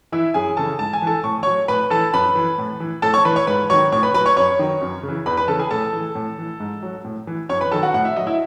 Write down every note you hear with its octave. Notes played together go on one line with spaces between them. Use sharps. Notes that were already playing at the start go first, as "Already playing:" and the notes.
E3 E4 E5
F#2 G#4 G#5
C#3 E3 A4 A5
G#2 A5
G#5
E3 A4 A5
A2 C#6
F#3 C#5 C#6
A2 B4 B5
E3 A4 A5
F#2 B4 B5
E3
A2
E3
A2 A4 A5
C#5 C#6
E3 B4 B5
C#5 C#6
G#2 B4 B5
D#3 F#3 C#5 C#6
A2 C#5 C#6
B4 B5
F#3 B4 B5
C#5 C#6
F#2 C#5 C#6
D#3 F#3
F#2
C#3
E3
E2 B4 B5
B4 B5
C#3 E3 A4 A5
G#4 G#5
A2 A4 A5
E3
A2
E3
G#2
F#3
A2
E3
F#2 C#5 C#6
B4 B5
D#3 F#3 A4 A5
F#4 F#5
A2 F#5
E5
F#3 D#5
E4 E5